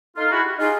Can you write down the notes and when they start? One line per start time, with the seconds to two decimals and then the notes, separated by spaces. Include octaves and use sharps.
0.16 D#4 F4 A4
0.31 E4 F#4 G#4
0.44 G4
0.58 D#4 F4 G#4